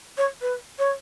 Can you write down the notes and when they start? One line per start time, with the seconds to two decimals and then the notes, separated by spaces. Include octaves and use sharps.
0.18 C#5
0.42 B4
0.79 C#5